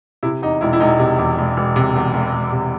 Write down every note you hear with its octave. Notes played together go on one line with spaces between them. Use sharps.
C3 E4
E2 D#4
E1 E4
E4
E1 D#4
C3
E2
E1
E1
C3
E2
E1
E1
C3